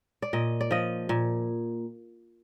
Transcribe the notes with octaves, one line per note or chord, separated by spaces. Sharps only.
D5
A#2 D#5
D5
F3 D#5
A#2